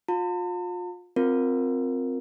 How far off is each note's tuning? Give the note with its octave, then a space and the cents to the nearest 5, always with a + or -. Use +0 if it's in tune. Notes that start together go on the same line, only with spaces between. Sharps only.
F4 +30 A5 +45
C4 +0 F4 +15 A#4 +0